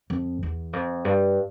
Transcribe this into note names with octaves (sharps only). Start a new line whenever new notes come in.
F2
E2
F2
G2